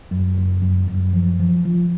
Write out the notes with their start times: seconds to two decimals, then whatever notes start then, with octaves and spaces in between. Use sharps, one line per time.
0.11 F#2
0.37 F#1
0.62 F#2
0.87 F#2
1.13 F3
1.40 F3
1.65 F3